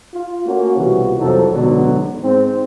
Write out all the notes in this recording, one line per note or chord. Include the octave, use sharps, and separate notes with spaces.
F4
A3 A#3 C#4 F#4
C2 B2 E3 F4 F#4
C2 F2 C3 F#3 D#4 A4
A1 G#2 B2 D3 F#3 B3
G#2 C4